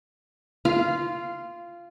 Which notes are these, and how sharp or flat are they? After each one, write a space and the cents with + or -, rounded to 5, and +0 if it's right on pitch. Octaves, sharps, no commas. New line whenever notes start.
F4 -15 F5 +0